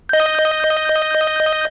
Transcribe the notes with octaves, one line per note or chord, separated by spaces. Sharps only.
D#5 G6